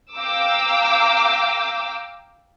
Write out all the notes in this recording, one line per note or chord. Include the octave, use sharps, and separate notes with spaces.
F5 G5 A#5 D6 E6